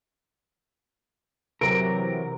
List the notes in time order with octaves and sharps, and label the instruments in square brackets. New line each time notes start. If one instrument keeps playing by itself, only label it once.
[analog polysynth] C3 E3 F#3 [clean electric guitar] A#4 [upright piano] D7